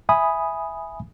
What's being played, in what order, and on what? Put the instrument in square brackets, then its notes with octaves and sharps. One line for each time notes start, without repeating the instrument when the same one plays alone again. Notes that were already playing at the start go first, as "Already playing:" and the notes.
[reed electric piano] E5 G#5 B5 D#6